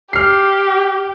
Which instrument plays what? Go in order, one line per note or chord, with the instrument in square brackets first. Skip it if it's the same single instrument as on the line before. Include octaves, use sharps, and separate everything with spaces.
[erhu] G4 [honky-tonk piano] F6 C7